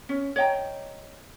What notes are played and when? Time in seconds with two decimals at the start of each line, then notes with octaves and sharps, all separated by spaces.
0.09 C#4
0.36 C#5 D#5 G5 A#5